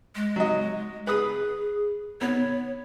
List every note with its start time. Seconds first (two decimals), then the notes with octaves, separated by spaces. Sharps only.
0.15 G#3
0.36 F#3 D#5
1.07 G#4 B4 D#6
2.21 B3 C#5